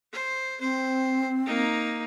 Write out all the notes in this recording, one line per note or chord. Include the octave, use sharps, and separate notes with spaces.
C5
C4 C5
A#3 D#4